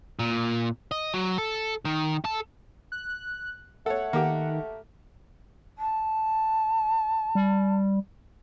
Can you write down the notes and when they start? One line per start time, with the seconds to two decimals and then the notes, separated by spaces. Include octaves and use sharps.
0.19 A#2
0.91 D#5
1.14 F#3
1.38 A4
1.85 D#3
2.25 A4
2.92 F#6
3.86 A3 A4 C#5 F#5
4.13 D#3 A#3 G4
5.78 A5
7.35 G3